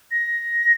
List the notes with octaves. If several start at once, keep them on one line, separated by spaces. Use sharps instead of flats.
A#6